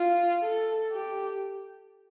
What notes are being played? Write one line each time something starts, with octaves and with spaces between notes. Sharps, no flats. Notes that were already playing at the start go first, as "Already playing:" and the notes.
Already playing: F4
A4
G4